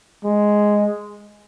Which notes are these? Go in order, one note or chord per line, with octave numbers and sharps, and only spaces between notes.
G#3